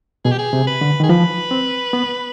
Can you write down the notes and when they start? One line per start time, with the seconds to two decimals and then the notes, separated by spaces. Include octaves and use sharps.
0.25 B2 G#4
0.32 G4
0.39 G#4
0.53 C3
0.67 B4
0.81 D3
1.00 D#3 G#4
1.09 F3 B4
1.51 C4
1.93 B3